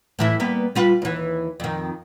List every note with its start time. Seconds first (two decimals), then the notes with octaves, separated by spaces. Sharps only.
0.19 A2 E3 E4
0.40 G3 A#3 B3
0.75 G3 F4 B4
1.02 D#2 E3
1.60 F2 D#3